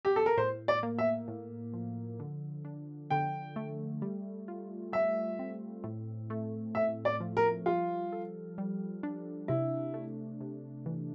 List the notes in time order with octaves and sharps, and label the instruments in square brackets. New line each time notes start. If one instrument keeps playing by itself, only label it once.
[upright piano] G4
A4
A#4
[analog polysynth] A2 [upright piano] C5
[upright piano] D5
[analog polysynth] A#3
[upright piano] E5
[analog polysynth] A2
F3
D3
D4
[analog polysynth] D3 [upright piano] G5
[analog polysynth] A3
G3
F4
[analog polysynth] G3 [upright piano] E5
[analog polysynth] C4
A2
A3
[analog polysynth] A2 [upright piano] E5
[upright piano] D5
[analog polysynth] F3
[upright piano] A#4
[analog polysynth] G3 [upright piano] F4
[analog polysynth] A4
G3
D4
[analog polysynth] C3 [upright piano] E4
[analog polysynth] A3
C3
E3